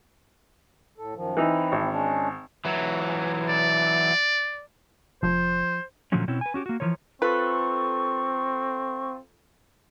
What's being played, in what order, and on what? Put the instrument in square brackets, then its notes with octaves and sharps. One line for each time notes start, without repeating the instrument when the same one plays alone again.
[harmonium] A2 A4
F#2 D#3 F3
[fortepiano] E3 D#4 [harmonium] C4 E4
[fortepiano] G#1
[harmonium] G#3 C#4 D4
[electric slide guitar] E3 F#3
[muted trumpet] D5
[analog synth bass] F1 [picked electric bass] F3 [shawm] C5
[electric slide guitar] A#2 D3 F3 F#3 A3 C#4
B2 C4 C#4 E4
B4 G#5
C#4 F#4 G4
A#3 F#4
E3 F3 A#4 C#5
[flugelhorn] C4 [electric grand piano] F4 A4 [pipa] B4 [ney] C#6